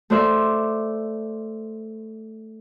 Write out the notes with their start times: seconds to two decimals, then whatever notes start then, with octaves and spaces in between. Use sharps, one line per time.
0.10 A3 C5 D5 E5